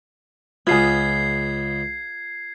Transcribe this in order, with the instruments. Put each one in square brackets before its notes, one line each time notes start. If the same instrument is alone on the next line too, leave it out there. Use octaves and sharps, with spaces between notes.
[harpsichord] C#2 B3 [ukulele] F4 G#4 [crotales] G#6 C7